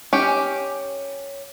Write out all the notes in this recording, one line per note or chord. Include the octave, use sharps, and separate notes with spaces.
C#4 G4